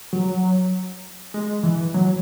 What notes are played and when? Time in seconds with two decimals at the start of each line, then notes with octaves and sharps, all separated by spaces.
0.13 F#3
1.34 G#3
1.63 E3
1.94 F#3